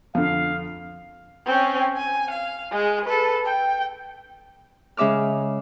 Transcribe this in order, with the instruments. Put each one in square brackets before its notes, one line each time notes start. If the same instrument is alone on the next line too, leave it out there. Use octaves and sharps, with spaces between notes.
[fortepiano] F2 D3 [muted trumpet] F5
[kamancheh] C4 C#4
G#5
F5
G#3 G#4
A4 B4
G5
[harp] C#3 G#3 E5 D6 F6